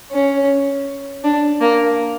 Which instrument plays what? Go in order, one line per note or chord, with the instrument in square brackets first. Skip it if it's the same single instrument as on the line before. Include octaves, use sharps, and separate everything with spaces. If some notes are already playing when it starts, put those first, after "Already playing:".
[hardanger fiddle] C#4
D4
A#3